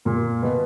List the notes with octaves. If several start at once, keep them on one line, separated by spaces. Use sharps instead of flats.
A#2 A#3
B2 B3